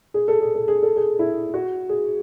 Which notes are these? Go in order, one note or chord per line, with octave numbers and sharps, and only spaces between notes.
G#4
A4
G#4
A4
G#4
A4
G#4
E4
F#4
G#4